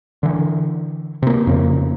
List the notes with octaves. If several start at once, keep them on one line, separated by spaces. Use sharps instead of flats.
D3 E3
C3 A#3
F2 C#3 A#3